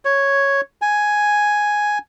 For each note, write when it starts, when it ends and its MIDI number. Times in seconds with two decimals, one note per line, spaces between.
0.05 0.61 73
0.82 1.98 80